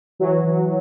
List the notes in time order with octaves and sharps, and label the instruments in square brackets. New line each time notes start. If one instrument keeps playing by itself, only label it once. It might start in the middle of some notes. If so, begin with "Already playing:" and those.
[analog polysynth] E3 F#3
E3